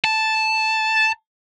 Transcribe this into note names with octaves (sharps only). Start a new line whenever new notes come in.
A5